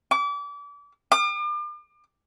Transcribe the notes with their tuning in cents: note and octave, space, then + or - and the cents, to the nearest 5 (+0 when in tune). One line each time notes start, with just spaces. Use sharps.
D6 -35
D6 +40